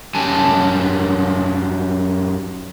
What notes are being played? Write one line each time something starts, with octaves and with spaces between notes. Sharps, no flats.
F#2 G3 G#5 A5